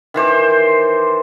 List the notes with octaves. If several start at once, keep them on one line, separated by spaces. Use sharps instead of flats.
D#3 E3 C5 D6